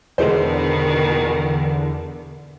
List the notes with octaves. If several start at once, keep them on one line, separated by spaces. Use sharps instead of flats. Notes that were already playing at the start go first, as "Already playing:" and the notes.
E2 B2 D3 D#3 G#3 C5